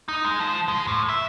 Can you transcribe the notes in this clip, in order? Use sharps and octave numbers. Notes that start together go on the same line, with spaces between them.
D#4
G#3
F3
G#3
A2
E5